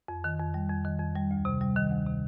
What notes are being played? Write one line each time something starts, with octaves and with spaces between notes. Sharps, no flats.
F2
D#3
F2
G3
F2
D#3
F2
G3
D2
C3
G3
D#3
D2
C3